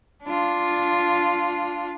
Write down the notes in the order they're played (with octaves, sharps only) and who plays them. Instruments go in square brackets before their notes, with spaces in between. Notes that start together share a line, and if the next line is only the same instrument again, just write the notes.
[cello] D4 F4